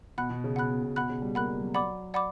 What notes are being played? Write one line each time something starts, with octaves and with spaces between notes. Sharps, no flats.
B2 F#5 B5 F#6
B2
C#3
B2 F#5 B5 F#6
B2
B2
B2 F#5 B5 F#6
C#3
G3
A#3 F#5 B5 F#6
G3
F#3
D5 F#5 B5 D6
D5 F#5 B5 D6